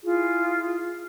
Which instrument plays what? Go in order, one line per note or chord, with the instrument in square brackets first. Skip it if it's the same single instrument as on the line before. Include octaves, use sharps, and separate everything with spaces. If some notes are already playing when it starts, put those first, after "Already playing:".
[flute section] E4 F4 G#4